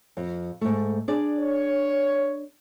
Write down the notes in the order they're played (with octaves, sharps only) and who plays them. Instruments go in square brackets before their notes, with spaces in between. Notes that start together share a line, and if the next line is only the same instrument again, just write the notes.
[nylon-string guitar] F2
G#2 A3
D4 G#4 D5
[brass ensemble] C#5